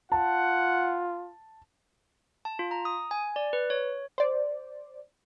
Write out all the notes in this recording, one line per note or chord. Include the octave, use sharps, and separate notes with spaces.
F4 F#5 A5
A5
F4
A#5
D#6
G#5
D5
B4
C#5
C5 D5